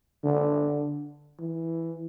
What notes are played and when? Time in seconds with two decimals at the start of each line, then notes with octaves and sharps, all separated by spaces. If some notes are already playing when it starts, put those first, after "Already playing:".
0.24 D3
1.40 E3